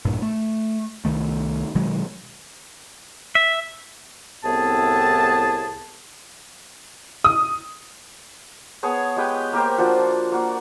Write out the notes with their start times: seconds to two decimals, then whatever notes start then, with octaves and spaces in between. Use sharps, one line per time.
0.05 A#1 G2 A#2
0.22 A3
1.05 C2 D#3 A3
1.75 B2 D#3 F#3 G#3
3.35 E5
4.45 C2 A2 B3 C4 G#4 A5
7.24 D#6
8.83 B3 G#4 C#5 A5
9.16 G#3 G4 B4 G5
9.53 A#3 G4 A#4 C5
9.78 F3 D4 F4 F#4
10.32 A#3 F#4 D5